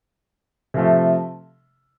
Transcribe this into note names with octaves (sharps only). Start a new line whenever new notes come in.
C3 F3 A3